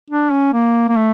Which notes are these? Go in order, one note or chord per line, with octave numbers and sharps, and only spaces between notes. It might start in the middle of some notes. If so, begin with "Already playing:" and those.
D4
C#4
A#3
A#3
A3